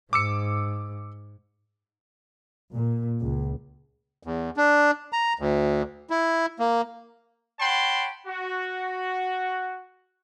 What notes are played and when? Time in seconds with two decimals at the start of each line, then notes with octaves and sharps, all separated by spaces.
0.13 G#2 D6 E6 C#7
2.73 A#2
3.19 C#2
4.23 E2
4.57 D4
5.13 A#5
5.39 D2
6.10 E4
6.59 A#3
7.60 C#5 F#5 G5 A5 B5 C6
8.27 F#4